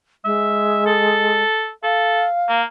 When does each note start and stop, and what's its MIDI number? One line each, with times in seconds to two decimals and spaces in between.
0.25 1.42 56
0.25 0.82 76
0.86 1.71 69
1.83 2.25 69
1.83 2.63 77
2.49 2.64 58